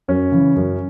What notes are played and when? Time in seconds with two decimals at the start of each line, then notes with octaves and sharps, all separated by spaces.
0.08 F#2 C#4
0.32 C#3 E3
0.56 F#2